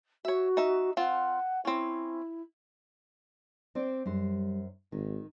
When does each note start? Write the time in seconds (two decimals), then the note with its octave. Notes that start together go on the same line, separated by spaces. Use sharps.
0.25 F#4 C#5 E5
0.57 D#4 E5
0.97 C4 F4 F#5
1.65 C4 C#4 E4
3.75 C4 C5 D5
4.06 F#2 G3 C5
4.92 G#1 D#3